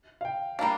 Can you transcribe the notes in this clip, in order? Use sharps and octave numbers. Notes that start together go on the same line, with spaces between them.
F5
G5
G3 A#3 D4 F5